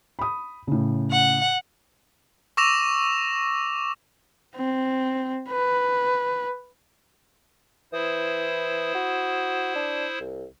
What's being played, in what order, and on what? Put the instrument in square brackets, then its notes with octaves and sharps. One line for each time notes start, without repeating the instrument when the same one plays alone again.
[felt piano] B5 D#6
A2 C#3
[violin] F#5
[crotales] C#6 D6 E6 A#6 E7 F7
[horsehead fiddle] C4
B4
[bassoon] E3 [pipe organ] E4 C5 D#6
[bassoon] F#4
D4
C2